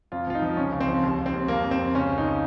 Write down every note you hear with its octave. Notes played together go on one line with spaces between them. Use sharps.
F2 F4
F3 F4
D#4
F3
C#2 C#4
C#2
C4
F3
D#2
D#2
C4
D#2
F2 A#3
F2
C4
F2
C#2 C#4
F3
D#4